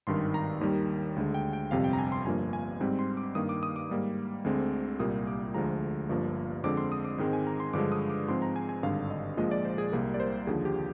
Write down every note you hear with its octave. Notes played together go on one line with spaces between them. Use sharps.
G#1 G2 D#3 C6
A#5
D#2 D#3 G3
D2 D3 G#3
G5
G5
G1 F2 C3 G3 F5
G5
A#5
G#5
C6
G1 G2 F3 A#3 G#5
G#5
G#2 G3 C4
C6
D6
G2 D#3 A#3 D#6
D6
D#6
D6
G#2 G3 A#3
D2 D3 G#3 C4
C2 A#2 G3 A#3 D#6
D6
D2 D3 F3 G#3 A#5
G1 G2 F3 A#3
F2 D3 G#3 C4 D6
C6
D#6
D6
G#2 D#3 G#3 C4 G5
G#5
A#5
C6
G2 D3 F3 G#3 D6
D#6
D6
G#2 F3 G#3 C4 C6
A#5
G#5
G#5
G#1 G2 D3 F5
D#5
A#1 A#2 F3 G#3 D#5
D5
C5
G#4
C2 C3 G3 A#3 A#4
D5
C5
D#2 D3 F3 G#4
G4